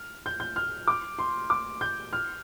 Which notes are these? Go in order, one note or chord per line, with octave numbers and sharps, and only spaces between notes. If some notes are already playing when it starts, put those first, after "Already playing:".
Already playing: F6
G6
G6
F6
D6
C6
D6
G6
F6